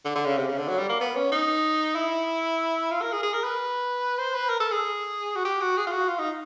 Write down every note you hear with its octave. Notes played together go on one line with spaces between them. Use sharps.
D3
D3
C#3
C3
C#3
D3
F#3
G3
A#3
B3
C#4
D#4
E4
F4
A#4
G#4
G#4
A#4
B4
C5
B4
A#4
A4
G#4
F#4
G4
F#4
G#4
F4
F#4
F4
D#4